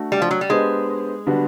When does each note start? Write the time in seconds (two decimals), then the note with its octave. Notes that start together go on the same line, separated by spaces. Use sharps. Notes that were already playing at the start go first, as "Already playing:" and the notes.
Already playing: A3 D4 F#4
0.12 G3
0.22 F3
0.31 F#3
0.41 G3
0.50 G#3 B3 D4 G4 C5
1.26 D3 G3 B3 D4 F#4